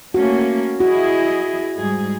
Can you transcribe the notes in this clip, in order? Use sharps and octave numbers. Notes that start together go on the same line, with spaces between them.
A3 A#3 C#4 F#4
E4 F#4 G#4 D#5
G#2 G3 G#4